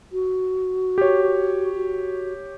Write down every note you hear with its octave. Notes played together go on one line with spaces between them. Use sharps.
F#4
G4 C#5
F#4